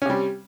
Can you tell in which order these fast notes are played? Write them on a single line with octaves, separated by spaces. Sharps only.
C#4 C3 G3